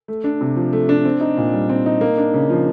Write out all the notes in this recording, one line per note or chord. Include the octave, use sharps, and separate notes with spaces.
A3
D4
C3
F3
A3
D4
C4
D#4
A#2
G3
C4
D#4
A#3
D4
C#3
F3